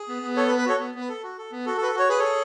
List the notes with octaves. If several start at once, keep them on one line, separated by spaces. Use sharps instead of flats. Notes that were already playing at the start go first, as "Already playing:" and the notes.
Already playing: G#4
B3
B3
A4 C#5
B4
B3
B4
F#4 A4 C#5
B3
B3
B4
A4
F#4
A4
B3
F#4 A4
A4
F#4 B4
A4
F#4 C#5
G#4 B4
A4 C#5
G#4